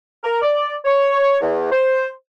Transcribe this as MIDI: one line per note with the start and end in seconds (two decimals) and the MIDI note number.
0.23 0.41 70
0.42 0.74 74
0.84 1.36 73
1.40 1.69 40
1.71 2.07 72